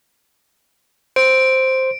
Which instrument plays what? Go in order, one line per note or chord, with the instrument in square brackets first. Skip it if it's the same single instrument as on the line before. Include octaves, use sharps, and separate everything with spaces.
[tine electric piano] C5 [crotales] D7